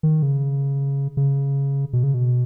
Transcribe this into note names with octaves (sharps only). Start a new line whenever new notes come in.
D#3
C#3
C#3
B2
C#3
B2